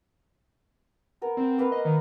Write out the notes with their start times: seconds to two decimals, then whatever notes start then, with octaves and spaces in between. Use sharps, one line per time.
1.21 B3 A#4
1.37 C4
1.58 A#3 B4 F5
1.72 D#5
1.85 D#3